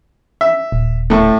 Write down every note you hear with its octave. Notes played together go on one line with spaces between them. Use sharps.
E5
D#1
A2 A3